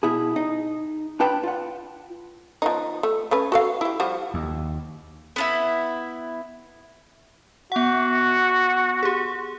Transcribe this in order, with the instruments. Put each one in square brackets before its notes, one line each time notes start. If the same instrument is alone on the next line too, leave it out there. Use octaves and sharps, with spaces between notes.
[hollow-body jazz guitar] B2 E4 G#4
D#4
D4 F4 B4 G5 A5 B5
F4 F#5
[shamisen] F3 B3 D#4
A3
A3 C#4 B4
F#4 A4 F5
E4 G4
F3 G3 F#4
[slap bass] D#2
[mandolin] B3 D4 E4
[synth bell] B3 F#5 [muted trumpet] F#4
[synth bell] G4 G#4